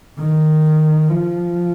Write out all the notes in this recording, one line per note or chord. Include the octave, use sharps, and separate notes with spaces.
D#3
F3